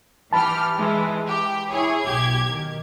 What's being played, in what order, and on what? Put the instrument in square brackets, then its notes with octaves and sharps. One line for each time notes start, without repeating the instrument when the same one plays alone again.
[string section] E3 G4 F6 [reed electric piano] A5 B5
[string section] E3 G#3
G4
E4 G#4 C#5
B1 G4 G#6
D#3